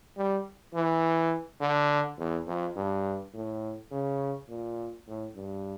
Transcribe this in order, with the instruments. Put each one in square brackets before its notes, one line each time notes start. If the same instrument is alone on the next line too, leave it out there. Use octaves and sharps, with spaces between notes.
[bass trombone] G3
E3
D3
E2
F2
G2
A2
C#3
A#2
A2
G2